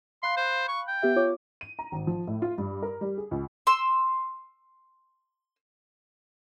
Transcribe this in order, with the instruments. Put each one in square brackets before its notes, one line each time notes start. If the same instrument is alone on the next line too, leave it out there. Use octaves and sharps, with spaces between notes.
[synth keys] F5 B5 F#6 [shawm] C6
[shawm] C5
C#6
G5
[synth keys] B3 G4 E5
F4 C#5 D6
[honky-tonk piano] D#7
A#5
G#1
F3
A2
F4
G2
A#4
G3
G#4
C#2
[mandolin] C6 E6